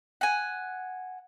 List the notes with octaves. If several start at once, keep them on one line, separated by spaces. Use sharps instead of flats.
F#5 G#5